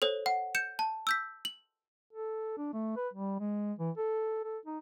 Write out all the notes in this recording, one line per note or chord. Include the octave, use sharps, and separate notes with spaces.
A4 C5 C#5
F#5
G6 C#7 E7
A5
E6 G6 B6
F#7
A4
D4
A3
B4
G3
G#3
E3
A4
A4
D#4